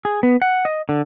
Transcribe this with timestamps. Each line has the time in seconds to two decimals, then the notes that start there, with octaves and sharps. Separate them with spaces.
0.05 G#4
0.23 B3
0.42 F#5
0.65 D#5
0.89 D3